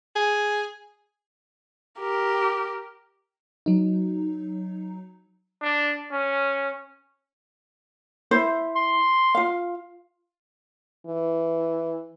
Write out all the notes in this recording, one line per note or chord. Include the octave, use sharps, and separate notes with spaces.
G#4
G4 A#4
F#3 D#4
D4
C#4
E4 C5 E5
C6
F4 F5
E3